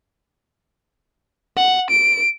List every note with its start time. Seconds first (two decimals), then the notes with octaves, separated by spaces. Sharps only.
1.57 F#5
1.90 D7